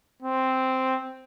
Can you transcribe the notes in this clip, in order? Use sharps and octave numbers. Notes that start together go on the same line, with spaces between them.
C4